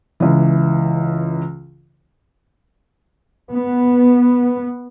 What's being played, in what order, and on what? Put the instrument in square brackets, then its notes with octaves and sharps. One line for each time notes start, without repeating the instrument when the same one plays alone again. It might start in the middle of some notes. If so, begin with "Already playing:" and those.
[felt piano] C#2 E3
[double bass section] B3